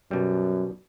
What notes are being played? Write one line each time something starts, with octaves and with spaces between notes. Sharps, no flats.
F#2 B2 G3